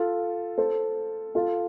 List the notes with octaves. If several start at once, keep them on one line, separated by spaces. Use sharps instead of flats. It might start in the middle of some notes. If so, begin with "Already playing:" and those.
Already playing: F4 A4
A4 C5
F4 A4